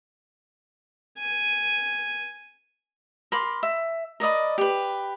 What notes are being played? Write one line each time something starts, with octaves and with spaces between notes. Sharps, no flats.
G#5
A#4 B5 C6 D6
E5
A#4 D5 D#5 B5
G4 B4